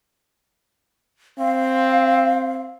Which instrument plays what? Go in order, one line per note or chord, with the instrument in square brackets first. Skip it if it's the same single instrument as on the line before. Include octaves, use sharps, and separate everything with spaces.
[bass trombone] C4 [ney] F5